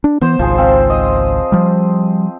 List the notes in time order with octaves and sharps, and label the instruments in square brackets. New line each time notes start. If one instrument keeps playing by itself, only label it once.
[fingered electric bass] D4
[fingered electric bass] E3 B3 [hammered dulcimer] C5
[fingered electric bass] G#1 C#2 G#2 [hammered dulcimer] F3 G#4
[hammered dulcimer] C4 F5
D#5
[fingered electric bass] F3 G3